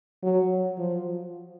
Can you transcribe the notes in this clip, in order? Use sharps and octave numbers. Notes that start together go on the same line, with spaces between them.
F#3
F3